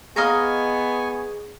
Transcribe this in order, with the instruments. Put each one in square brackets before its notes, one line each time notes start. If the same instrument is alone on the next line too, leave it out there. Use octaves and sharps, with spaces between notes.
[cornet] B3 [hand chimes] G#4 [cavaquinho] D#5 F5 A#5 [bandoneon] G#5 C#6